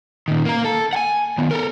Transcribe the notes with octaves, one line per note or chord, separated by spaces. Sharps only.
A#2 D#3
A#3 A#4
A4
F#5 G#5
D#3 B3
A4 A#4